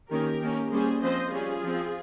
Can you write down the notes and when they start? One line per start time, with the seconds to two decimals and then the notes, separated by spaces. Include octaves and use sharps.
0.10 D#3 A#3 C#4 G4 A#4
0.42 D#3 A#3 C#4
0.72 G3 A#3 C#4 G#4 C5
1.02 F3 C4 C5 D#5
1.32 G3 C#4 F4 G#4
1.64 F3 C4